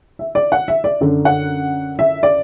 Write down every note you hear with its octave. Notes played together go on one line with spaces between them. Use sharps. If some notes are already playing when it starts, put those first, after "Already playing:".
E5
D5
F#5
E5
D5
F#2 D3
F#5
E5
D5